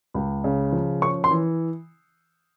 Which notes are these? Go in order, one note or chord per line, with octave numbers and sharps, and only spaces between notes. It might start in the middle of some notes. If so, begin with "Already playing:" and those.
C#2
C#3
F3
C#4 C#6
C6
E3